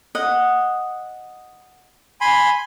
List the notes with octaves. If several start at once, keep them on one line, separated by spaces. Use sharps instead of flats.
D#5 F#5
G#5 B5 C6